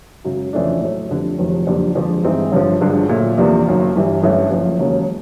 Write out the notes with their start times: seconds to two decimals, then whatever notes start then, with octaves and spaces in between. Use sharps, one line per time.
0.25 G#1 F#2 C#3 F#3
0.53 F2 C#3 E3 A3 D4
0.81 A2 F#3 A3
1.09 F2 D3 G3 C4
1.38 F1 F2 C3 D#3 F#3
1.67 F#1 F2 D3 G3 A#3
1.95 F2 D3 F3 G#3
2.23 G2 E3 G#3 C4 D#4
2.52 A1 G2 D3 F3
2.81 G#1 G2 D3 F3 G#3
3.09 A#2 F#3 A3
3.37 E2 C3 F3 A#3 D4
3.65 F#1 F#2 D#3
3.95 G1 G2 E3 G3
4.22 A1 G2 E3 A3 C#4
4.51 F#1 F2 C#3 F3
4.79 E1 D#2 C#3 F#3 A#3